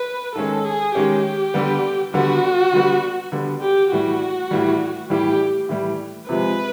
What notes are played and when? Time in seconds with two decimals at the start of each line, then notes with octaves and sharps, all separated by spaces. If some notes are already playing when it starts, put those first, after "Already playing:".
Already playing: B4
0.35 D#3 G#3 C#4 A4
0.65 G#4
0.95 D#3 G#3 C#4 G4
1.54 D3 G3 B3
2.13 D3 G3 B3 F#4
2.73 D3 G3 B3
3.32 D3 G3 B3
3.62 G4
3.91 A2 E3 G3 F#4
4.51 A2 E3 G3
5.10 A2 E3 G3 G4
5.69 A2 E3 G3
6.29 C3 F3 G#3 B4